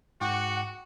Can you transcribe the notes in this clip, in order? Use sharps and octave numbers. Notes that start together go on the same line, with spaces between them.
G#2 F#4 F#5 G5 D6